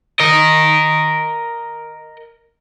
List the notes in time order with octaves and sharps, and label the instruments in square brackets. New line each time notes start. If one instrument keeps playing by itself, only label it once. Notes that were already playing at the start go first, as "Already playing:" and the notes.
[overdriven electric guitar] A#4 D#5